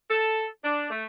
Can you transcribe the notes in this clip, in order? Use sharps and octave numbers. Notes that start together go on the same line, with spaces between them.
A4
D4
A3